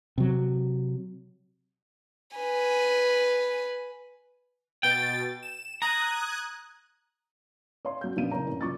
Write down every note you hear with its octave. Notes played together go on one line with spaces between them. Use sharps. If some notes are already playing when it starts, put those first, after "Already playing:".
C3 F#3
B4 G#5
B2 G5 A6
E7
A#5 D#6 F#6 G#6
C#5 F5 C6
F#3 G6
A#1 F#2 B3 F5 D#7
F#1 C#5 A#5
A1
F#1 F4 C#6 D6 A6